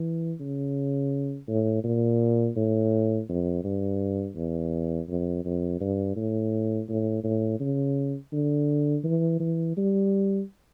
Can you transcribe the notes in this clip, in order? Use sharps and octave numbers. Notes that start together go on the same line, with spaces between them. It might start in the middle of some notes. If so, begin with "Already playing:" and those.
Already playing: E3
C#3
A2
A#2
A2
F2
G2
E2
F2
F2
G2
A2
A2
A2
C#3
D3
E3
E3
G3